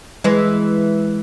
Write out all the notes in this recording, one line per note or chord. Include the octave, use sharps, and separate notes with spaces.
E3 G#3